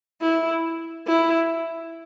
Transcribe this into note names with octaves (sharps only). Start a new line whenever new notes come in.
E4
E4